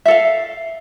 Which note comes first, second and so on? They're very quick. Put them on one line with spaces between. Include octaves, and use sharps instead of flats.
E5 A4 F5